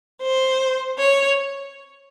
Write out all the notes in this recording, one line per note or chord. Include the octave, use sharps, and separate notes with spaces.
C5
C#5